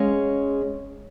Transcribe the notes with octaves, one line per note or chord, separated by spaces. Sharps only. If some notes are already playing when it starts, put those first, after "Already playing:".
Already playing: G#3 C#4 G#4 C#5 F5